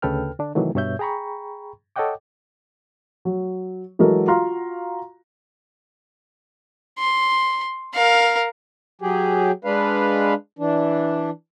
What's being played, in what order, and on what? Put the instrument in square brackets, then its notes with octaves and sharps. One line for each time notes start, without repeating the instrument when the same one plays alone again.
[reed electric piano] D2 C#3 A4 B4 G5 F6
D3 D4
C3 D#3 E3 F#3 A3
G2 B2 C#5 E5 G6
G#4 G5 A#5 B5 C#6
A4 C#5 D#5 F#5 G5 D6
[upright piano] F#3
E3 F#3 G#3 F#4 A4 A#4
F4 F#4 F5 A#5 C6 F6
[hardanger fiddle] C6
A#4 F5
[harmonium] F#3 G4 G#4
G#3 D4 B4 F5
E3 D4